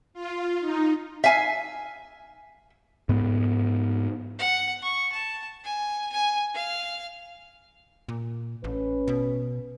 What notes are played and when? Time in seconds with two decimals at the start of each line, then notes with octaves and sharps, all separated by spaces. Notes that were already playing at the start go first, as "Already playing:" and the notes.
0.13 F4
0.60 D#4
1.24 E5 F5 G#5
3.09 G#2 B3
4.39 F#5
4.82 C#6
5.12 A5
5.64 G#5
6.12 G#5
6.54 F5
8.09 A#2
8.64 A1 C#4 B4
9.07 B2